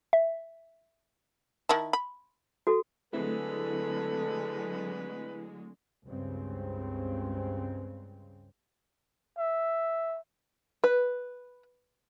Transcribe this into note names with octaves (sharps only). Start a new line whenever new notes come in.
E5
D#3 E4 A5
B5
F#4 A4
D3 F#3 G#3 A3 C4 E4 A4 B4
C#2 G2 C#3 C4
E5
B4